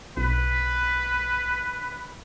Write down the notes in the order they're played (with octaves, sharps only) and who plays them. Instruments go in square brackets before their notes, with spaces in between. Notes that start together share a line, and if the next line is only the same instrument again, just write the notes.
[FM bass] B1 [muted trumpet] B4